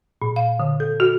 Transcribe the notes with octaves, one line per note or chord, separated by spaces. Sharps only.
A#2
F5
D3
A4
F#4